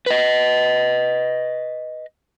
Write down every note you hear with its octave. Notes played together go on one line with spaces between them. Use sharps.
B4 D#5